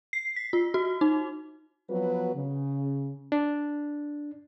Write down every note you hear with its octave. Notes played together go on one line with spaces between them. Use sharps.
C7
B6
F4
F#4
D#4
F3 F#3 B3 F#4 B4
C#3
D4